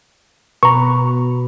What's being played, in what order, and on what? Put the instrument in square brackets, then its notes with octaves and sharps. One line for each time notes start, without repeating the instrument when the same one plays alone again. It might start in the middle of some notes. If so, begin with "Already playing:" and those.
[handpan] B2 B4 [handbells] A#5 C#6